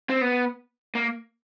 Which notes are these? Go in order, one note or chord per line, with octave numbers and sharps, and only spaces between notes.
C4
B3
A#3